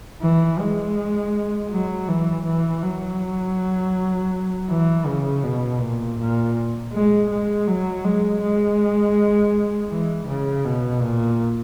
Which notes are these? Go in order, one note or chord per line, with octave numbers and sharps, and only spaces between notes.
E3
G#3
F#3
E3
E3
F#3
E3
C#3
B2
A#2
A#2
G#3
G#3
F#3
G#3
G#3
E3
C#3
B2
A#2